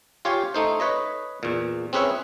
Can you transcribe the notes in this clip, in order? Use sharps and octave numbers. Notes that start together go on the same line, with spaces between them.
F4 G4 C#5 F5 G#5
A3 D#4 C5
B4 C#5 D#5
E2 A#2
C4 C#4 G#4 B4 C#5 E5